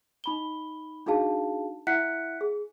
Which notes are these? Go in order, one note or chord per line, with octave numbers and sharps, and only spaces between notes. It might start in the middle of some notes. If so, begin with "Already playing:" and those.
D#4 B5 G7
D4 D#4 F#4 G#4 F5 A5
E4 E5 F#5 F#6 B6 C#7
G#4